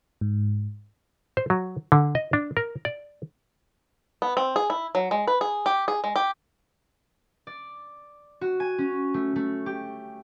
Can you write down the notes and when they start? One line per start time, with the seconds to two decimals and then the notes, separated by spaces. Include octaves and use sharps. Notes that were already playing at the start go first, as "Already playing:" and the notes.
0.21 G#2
1.37 C5
1.50 F#3
1.92 D3
2.15 D#5
2.33 D4
2.57 A#4
2.85 D5
4.22 B3
4.37 C4
4.56 G#4
4.70 E4
4.95 F#3
5.11 G#3
5.28 B4
5.41 G#4
5.66 G4
5.88 G#4
6.04 G#3
6.16 G4
7.47 D5
8.41 F#4
8.60 G#5
8.78 C#4
9.14 A3
9.36 A3
9.66 G4